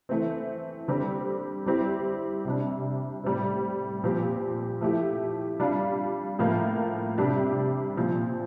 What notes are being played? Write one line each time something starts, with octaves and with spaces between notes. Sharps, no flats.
E3 A3 C4
D3 G3 C4 G4
G3 C4 E4 G4
C3 G3 D4
A2 G3 C4
A#2 F3 C4 G4
F3 A3 E4 G4
G3 D4 F4
A2 F3 A#3 F4
C3 G3 D4 G4
A#2 F3 C4